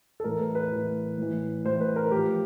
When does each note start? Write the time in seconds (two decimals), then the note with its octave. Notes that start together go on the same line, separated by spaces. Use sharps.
0.20 A4
0.24 A2 E3 A#4
0.40 B4
0.55 B4
0.72 A2 E3
1.18 A2 E3
1.65 A2 E3 C5
1.81 B4
1.96 A#4
2.11 A2 F3 G4